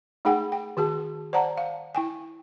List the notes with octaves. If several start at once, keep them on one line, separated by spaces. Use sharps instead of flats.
A3 D#4 G#4 F#5 G5
G5
D#3 F#4 G#4 A5
C5 D5 F#5 A5 A#5
F5
E4 G5 G#5